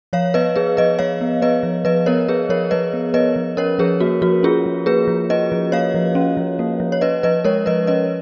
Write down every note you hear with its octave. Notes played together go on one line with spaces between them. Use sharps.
F3 C#5 F5
B3 B4 D#5
B3 G#4 B4
F3 B4 D#5
F3 C#5 F5
B3
B3 B4 D#5
F3
F3 B4 D#5
B3 A#4 C#5
B3 G#4 B4
F3 A#4 C#5
F3 B4 D#5
B3
B3 B4 D#5
F3
C#4 A#4 C#5
F3 G#4 B4
A#3 F#4
F3 F#4
C#4 F4 G#4
F3
A#3 G#4 B4
F3
C#4 B4 D#5
F3
A#3 C#5 F5
F3
C#4
F3
A#3
F3
C#5
C#4 B4 D#5
F3 B4 D#5
G#3 A#4 C#5
F3 B4 D#5
C#4 B4 D#5